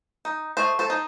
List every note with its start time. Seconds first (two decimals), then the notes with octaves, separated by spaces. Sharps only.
0.25 D#4
0.57 A3 C5 D#5
0.79 A4 C5
0.90 D#4